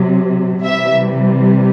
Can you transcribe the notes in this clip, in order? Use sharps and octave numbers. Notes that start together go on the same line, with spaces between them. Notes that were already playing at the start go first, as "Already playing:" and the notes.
Already playing: C3 F#3
C3 E3 G3 E5